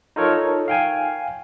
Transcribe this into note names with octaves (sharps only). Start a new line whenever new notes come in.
D#4 F4 A4 A#4 C#5
F5 G5 G#5